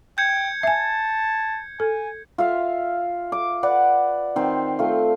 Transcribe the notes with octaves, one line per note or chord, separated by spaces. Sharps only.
G5 G6 G#6 C#7
E5 G#5 A5
A4 G#5
F4 E5 F5
D6
B4 D5 F#5
D#3 C4 C5
A3 F4